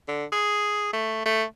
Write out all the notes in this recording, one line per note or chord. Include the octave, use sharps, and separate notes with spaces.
D3
G#4
A3
A3